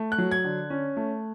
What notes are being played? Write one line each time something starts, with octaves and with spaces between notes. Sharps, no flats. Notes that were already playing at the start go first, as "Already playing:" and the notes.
Already playing: A3
F#6
F#3
G#6
D3
C#4
A3